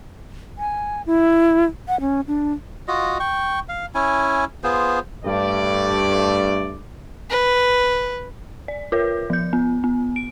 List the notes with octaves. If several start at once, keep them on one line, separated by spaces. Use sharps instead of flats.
G#5
E4
F#5
C#4
D4
F4 F#4 D#5
G5 C#6
F5
C#4 E4 G#5
B3 F4 G#4 C5
G2 A3 D5
B4
D5
F4 A#4 C#5
F3 G6
B3
B3
D7